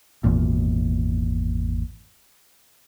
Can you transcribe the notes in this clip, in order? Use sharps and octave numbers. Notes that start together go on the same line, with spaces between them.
G#1 E2 A#2